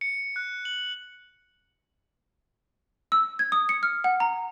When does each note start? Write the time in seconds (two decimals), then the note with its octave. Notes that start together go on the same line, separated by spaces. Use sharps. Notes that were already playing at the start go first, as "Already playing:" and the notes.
0.01 C#7
0.36 F#6
0.65 F#7
3.12 E6
3.39 G#6
3.52 D#6
3.69 C#7
3.83 F6
4.04 F#5
4.20 A#5